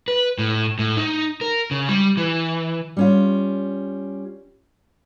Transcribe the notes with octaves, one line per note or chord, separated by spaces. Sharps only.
B4
A2
A2
D#4
A#4
C#3
G3
E3
G3 C#4 F4